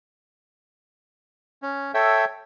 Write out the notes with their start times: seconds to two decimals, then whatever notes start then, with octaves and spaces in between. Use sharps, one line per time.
1.62 C#4
1.94 A4 C#5 E5 G5